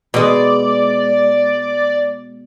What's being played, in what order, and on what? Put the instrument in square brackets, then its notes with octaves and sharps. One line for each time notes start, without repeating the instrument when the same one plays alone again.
[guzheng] B2 G#3 [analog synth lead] D5